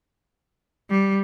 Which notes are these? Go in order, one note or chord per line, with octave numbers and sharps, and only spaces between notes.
G3